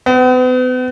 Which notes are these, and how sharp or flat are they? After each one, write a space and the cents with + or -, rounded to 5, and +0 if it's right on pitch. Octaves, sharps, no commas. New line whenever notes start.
B3 +40